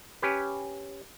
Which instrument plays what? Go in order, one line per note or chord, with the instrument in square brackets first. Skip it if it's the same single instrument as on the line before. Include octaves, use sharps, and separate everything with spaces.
[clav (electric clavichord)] C#4 G4 B4